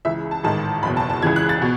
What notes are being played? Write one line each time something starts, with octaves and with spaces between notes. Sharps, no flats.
C#2 C#3 E3 E5
A5
A1 G#2 D#3 A5
F#1 E2 B2 B5
A5
A5
C#2 C#3 E3 G#6
F#6
A6
B2